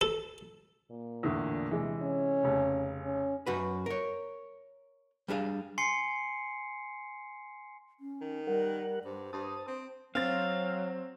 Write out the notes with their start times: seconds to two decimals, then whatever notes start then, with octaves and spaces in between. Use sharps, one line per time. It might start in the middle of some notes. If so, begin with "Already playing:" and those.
0.01 A4
0.91 A#2
1.23 E2 A2 D3
1.71 C3 E3 G#3
2.02 C#4
2.43 F1 C#3
3.04 C#4
3.46 F#2 F#4 B4
3.86 A#4 C#5
5.28 G3 D4 G#4 F5
5.78 G#5 C6 C7 C#7
8.00 C#4
8.21 D#3
8.47 G3 A#4 F#5
9.04 G2 C5
9.33 G2 A5 D#6
9.68 C4
10.15 F#3 C4 F5 A6